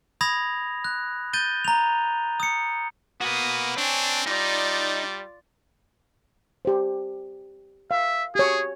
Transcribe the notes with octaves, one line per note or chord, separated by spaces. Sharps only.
B5 D#6 G#6 A#6 F7
F#6
G6 A6 D#7 G7
A#5 F7
D#6 C#7
A#3 F#4 B4 D#6
C4 D4 C#5 G#5
G3 D#4 F4 D5
G4 C5
E5 F5
G4 G#4 C#5